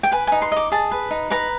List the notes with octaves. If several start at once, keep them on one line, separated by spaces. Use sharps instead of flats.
G5
B4 G#5
D#4 G#5
C6
D#5 D6
G#4 A5
B4
D#4
B4 A#5